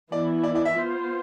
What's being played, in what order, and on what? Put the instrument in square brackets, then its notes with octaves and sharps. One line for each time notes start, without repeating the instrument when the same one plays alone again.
[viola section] E3 B3 E4 [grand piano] D5
[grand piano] D5
D5
E5
[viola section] B3 F4 C5